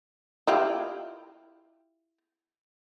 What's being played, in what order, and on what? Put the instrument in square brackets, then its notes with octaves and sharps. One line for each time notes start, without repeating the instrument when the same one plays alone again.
[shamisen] E4 F4 G4